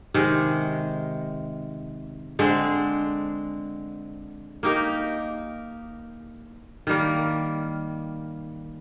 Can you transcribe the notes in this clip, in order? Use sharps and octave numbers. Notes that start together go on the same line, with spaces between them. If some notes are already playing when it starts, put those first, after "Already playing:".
C3 D#3 G#3
D3 G#3 C4
A#3 D#4 G4 A#4
D#3 G3 A#3